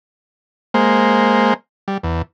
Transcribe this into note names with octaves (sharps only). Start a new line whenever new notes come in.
G#3 A#3 C5
G3
E2